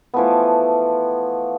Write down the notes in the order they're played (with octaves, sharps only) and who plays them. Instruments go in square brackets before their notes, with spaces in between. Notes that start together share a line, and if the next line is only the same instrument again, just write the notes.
[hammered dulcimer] E3 F3 A3 B3